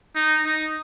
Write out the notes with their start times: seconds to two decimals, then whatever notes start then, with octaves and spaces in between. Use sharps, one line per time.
0.16 D#4
0.45 D#4